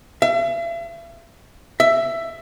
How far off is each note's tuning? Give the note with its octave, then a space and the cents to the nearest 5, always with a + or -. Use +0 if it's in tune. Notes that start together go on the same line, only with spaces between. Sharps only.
E5 +45
E5 +15